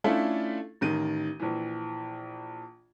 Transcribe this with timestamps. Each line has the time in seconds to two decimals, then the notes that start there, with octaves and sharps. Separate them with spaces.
0.04 A3 C#4 D4 E4 F4 A4
0.81 A1 D#3 D#7
1.40 A#1 E3